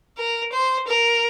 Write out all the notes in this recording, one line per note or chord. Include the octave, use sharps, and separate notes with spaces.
A#4
C5
A#4